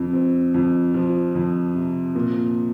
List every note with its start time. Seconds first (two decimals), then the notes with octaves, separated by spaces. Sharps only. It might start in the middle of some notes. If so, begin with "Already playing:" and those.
Already playing: F2 C4
0.13 C4
0.54 F2
0.94 F3
1.35 F2
1.75 C3
2.15 A#2